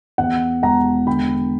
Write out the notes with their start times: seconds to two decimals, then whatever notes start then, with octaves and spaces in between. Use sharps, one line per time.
0.18 E2 F#5
0.62 E1 F#5 A#5
1.07 D3 G5 B5